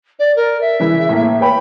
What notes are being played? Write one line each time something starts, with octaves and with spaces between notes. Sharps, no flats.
D5
A#4
E5
C#3 E3 E4
A2 A#3
B4 C#5 G5 B5